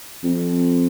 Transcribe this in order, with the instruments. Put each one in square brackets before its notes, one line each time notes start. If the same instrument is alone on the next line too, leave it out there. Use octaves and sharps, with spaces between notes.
[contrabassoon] F2